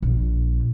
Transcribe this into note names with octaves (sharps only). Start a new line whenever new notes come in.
A#1